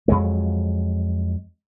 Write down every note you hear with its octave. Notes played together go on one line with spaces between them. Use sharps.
F2 F#3 G#3